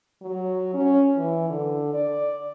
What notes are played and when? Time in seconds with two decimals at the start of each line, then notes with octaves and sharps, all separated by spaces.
0.22 F#3
0.74 C#4
1.16 E3
1.49 D3
1.93 D5